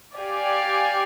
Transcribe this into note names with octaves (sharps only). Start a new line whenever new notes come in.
G4 D5 F5 G#5